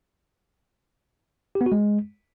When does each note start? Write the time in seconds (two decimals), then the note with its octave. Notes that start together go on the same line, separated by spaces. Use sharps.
1.55 G4
1.61 B3
1.66 F#4
1.72 G#3